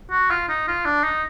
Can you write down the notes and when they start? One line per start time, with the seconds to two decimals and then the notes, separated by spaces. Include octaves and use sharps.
0.11 F#4
0.30 F4
0.49 D#4
0.67 F4
0.85 D4
1.04 D#4